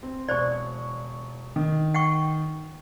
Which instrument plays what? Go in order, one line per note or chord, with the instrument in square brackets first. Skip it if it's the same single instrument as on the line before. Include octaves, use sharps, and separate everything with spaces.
[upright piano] C4
[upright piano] E1 C#6 [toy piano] C5 D5
[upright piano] D#3
[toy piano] F#5 G5 C#6